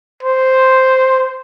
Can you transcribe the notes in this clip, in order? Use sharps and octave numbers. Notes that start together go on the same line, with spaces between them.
C5